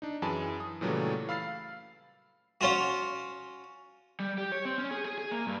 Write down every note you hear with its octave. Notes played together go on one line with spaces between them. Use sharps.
D4 D#4
F#2 E3 G#4 G#5 A5 B5
D#6
A#2 C#3 E3 F#3 G3 A3
F5 B5 E6 F6 A6 C7
C#4 F4 F#4
G3
G4
C#5
C4
C#4
G#4
G#4
G#4
A#3
G2